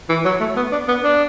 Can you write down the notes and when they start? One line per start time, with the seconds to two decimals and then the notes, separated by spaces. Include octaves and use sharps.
0.09 E3
0.25 F#3
0.40 A3
0.56 B3
0.72 D4
0.88 B3
1.04 D4